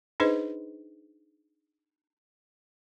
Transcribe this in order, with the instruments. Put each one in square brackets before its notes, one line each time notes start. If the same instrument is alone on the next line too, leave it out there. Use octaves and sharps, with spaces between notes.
[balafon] D4 D#4 G#4 B4 C5 D#5